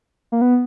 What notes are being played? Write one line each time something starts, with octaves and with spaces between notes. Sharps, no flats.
A#3
B3